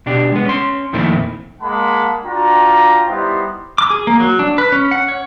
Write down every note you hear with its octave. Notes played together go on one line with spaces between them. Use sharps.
B2 D4 G4
G#3 B3
C#4 C6
F2 A#2 D#3 A3 C4 E4
G#3 A#3 F#5 A5 B5
D4 F4 F#4 G5 A#5
G3 B3 D#4 E4 C5
D6
G#4
A#3
F#3
D4
B4
C#4
F#5
C#5